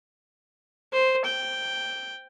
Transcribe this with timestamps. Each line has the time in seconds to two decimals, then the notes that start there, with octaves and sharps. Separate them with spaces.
0.92 C5
1.25 G5